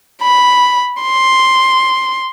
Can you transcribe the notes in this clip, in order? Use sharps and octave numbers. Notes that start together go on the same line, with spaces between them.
B5
C6